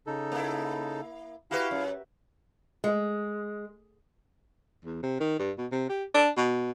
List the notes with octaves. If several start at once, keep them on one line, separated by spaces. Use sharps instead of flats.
C#3 D#4 A4
A#3 E4
E4 F#4 G4 B4 F5
F#2
G#3
E2
C3
D#3
G2
B2
C3
G4
D4
B2